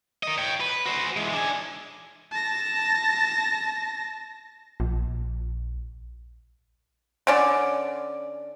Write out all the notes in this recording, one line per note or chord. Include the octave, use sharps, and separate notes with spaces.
A#4 D#5
C#5 G5
B4
F#4 C5
E3 G#3
D4 G#5
A5 A#6
A#1
D3 C#4 D5